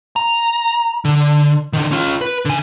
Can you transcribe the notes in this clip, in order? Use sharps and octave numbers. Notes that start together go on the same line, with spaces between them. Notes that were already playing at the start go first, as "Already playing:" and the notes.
A#5
D3
D3 D#3
C#4 F4
B4
D3 G#5